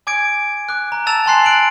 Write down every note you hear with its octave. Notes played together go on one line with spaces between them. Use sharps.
G#5 D6 G#6 D7
D6 F#6
A#5
A5 A#5 E6 A6 E7 F7
G#5 A5 C6 F#6 C7
F#6 D7 F#7